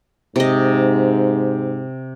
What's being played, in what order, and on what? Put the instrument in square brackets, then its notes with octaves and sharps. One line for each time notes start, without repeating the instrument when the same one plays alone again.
[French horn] G#2 [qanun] C3 D#5